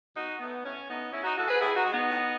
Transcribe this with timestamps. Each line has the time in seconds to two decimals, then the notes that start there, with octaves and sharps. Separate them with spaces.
0.16 B2 D#4 F#4
0.40 F#3 A3 B3
0.64 A2 C#4
0.88 F#3 A3 B3 D#4
1.12 C#3 C#4 E4
1.23 D#4 F#4
1.36 E3 A3 F#4 A4
1.48 G#4 B4
1.59 A2 E4 G#4
1.75 D#4 F#4
1.84 G#3
1.91 B3 D#4
2.08 A2